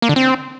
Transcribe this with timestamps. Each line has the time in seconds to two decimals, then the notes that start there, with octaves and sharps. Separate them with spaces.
0.02 A#3
0.09 D3
0.16 C4